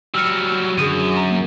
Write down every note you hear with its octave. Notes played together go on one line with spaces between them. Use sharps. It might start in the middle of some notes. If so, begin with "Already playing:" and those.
F#3 G3 E6 F6 C#7
F#2 D3 D#3 F#3 G#4 D#6 D#7
A#5
A#3